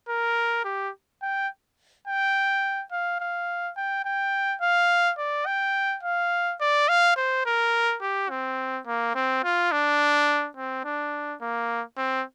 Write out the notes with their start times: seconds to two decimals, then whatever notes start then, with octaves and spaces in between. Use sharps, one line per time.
0.09 A#4
0.64 G4
1.22 G5
2.07 G5
2.91 F5
3.20 F5
3.77 G5
4.05 G5
4.61 F5
5.18 D5
5.46 G5
6.03 F5
6.61 D5
6.89 F5
7.16 C5
7.46 A#4
8.02 G4
8.30 C4
8.86 A#3
9.15 C4
9.44 F4
9.72 D4
10.57 C4
10.85 D4
11.41 A#3
11.98 C4